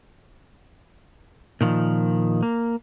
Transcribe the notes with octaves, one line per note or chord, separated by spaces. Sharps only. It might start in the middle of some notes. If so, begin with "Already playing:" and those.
A#2 D#3 F3
A#3